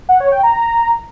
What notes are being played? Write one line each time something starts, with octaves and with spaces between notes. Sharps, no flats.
F#5
C#5
G5
A#5